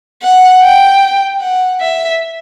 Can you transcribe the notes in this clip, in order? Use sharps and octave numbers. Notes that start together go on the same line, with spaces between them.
F#5
G5
F#5
E5